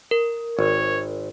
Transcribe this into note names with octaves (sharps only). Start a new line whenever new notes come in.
A#4
G#1 C#5